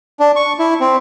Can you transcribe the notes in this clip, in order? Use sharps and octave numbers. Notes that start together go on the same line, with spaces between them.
D4
C#6
E4
C4